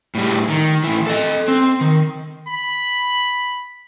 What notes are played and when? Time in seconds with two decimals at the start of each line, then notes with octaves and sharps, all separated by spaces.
0.15 A2 G3
0.50 D#3
0.84 A2 E3
1.07 A4 D#5
1.48 C4
1.81 D#3
2.48 B5